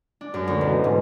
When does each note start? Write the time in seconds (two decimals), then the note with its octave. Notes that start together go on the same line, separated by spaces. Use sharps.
0.21 D4
0.34 F#2
0.48 D2
0.61 E1
0.84 G#2